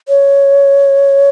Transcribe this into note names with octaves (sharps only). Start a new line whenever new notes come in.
C#5